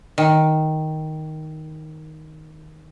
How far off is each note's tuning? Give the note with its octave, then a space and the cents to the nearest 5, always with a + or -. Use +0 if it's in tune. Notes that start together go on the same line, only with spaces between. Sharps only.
D#3 +5